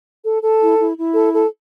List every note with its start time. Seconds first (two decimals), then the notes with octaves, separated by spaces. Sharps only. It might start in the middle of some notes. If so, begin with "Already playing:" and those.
0.25 A4
0.43 A4
0.61 E4
0.79 E4
0.97 E4
1.15 A4
1.33 A4